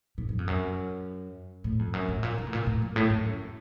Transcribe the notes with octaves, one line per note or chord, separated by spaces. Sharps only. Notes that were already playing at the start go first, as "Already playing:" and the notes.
A#2
F#2
F2
F#2
A2
F2
F#2
A2
A#2
C3
A2
A#2
A2
F#2
A2
A2
F#2